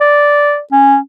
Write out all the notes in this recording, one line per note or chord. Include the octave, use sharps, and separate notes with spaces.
D5
C#4